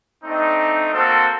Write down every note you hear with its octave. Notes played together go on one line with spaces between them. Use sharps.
A3 C4 D4 D#4
A#3 C4 F#4 A4 C5